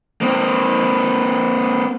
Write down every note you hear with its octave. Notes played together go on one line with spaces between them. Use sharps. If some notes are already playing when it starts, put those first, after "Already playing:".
A#3 C4